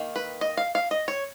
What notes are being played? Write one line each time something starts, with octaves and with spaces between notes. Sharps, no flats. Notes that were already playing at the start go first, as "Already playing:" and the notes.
Already playing: D#3 A#3
B4
D#5
F5
F5
D#5
C#5